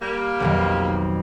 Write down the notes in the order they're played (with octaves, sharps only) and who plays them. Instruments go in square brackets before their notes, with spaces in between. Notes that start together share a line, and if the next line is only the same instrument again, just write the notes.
[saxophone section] G3 A#3
[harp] B1 F2 D#3